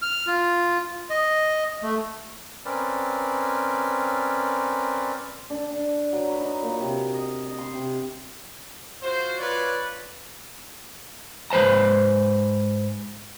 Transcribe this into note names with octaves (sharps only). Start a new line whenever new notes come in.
F6
F4
D#5
A3
C4 C#4 A#4 B4 D5
D4
D4
F#3
B4
D#4
A#2
C3
D#5
D#5
C6
C3
F4 F#4 C5
F4 B4 C#5 D5
G#2 B4 C5 A5 A#5